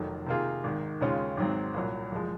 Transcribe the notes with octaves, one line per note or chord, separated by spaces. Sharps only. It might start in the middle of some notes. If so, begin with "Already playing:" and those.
Already playing: F1 F2 D#3 F#3
C3 D#3 A#3 F4 G#4
G#1 G#2 D#3
D#2 C#3 G#3 C#4 F4
G#1 G#2 F#3 C4
C2 A#2 F#3
F#1 F3 G#3